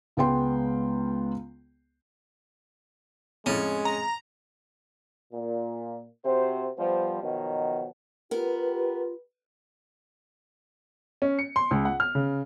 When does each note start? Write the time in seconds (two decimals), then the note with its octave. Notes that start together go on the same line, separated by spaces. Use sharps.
0.17 C#2 G#3 B3 G5 C6
3.46 F2 A2 G#3 C#4
3.85 A#5
5.33 A#2
6.25 C3 F#4 C5
6.78 F3 G3 B3 C5
7.22 B2 D#3 F3 F#3
8.31 B3 F4 G4 A#4 B4
11.22 C#4
11.39 C#7
11.56 C6
11.71 C#2
11.85 F#5
12.00 F6
12.15 C#3